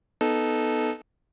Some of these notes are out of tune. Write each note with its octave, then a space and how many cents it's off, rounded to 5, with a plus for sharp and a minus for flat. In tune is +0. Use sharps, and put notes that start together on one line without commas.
B3 +0 D#4 +0 A4 -10